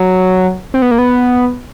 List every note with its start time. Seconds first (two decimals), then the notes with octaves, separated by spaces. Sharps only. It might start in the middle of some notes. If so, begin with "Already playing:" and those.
Already playing: F#3
0.74 C4
0.82 B3
0.91 A#3
0.98 B3